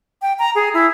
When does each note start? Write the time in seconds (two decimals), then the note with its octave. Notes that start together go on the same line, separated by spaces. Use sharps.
0.22 G5
0.39 A#5
0.55 G#4
0.74 E4